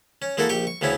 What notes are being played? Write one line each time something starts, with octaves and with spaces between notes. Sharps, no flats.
C#4
G#3 A#3 E4 F#4 A4
A#1 G4 G5 C#6
C#6
D2 C#3 B3 C#4 E4